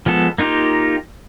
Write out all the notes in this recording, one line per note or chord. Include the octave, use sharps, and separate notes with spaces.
F3 G#3 B3 A4
A#3 D#4 F4 G4